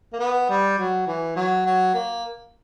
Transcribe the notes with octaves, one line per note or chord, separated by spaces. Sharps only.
A#3
B3
G3
F#3
E3
F#3
F#3
A#3